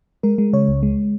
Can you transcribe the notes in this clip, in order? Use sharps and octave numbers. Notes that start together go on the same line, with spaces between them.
G#3 A#4
G#3
C#3 C#5
C#2
G#3